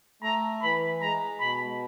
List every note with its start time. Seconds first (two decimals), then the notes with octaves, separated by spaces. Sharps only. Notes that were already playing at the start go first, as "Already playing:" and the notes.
0.22 A3 A#5
0.62 E3 B5
1.02 G#3 A#5
1.40 B2 B5